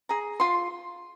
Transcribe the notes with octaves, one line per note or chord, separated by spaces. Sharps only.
G#4 A#5
F4 C6